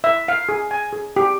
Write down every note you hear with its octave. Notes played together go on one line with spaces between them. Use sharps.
E5
F5
G#4
G#5
G#4
G4